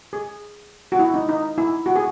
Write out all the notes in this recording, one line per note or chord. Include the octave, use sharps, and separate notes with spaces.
G#4
F#4
E4
D#4
D#4
E4
F#4
G#4